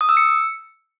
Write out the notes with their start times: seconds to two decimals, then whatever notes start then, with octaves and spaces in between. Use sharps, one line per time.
0.01 D#6
0.09 E6
0.17 C#7